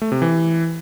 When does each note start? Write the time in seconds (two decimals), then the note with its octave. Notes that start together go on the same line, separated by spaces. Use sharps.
0.02 A3
0.12 C3
0.22 E3